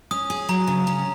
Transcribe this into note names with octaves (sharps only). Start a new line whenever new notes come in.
C#4 D#6
G#4
F#3 A#5
C#3
C#4 A#5